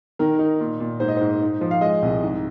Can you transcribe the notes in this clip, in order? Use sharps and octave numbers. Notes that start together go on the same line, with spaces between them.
D#3 A#4
D#4
A#2
A#2
G#2 C5
D#5
G#2 C5
D#4
F3
F5
G#3 D#5
C2
G#2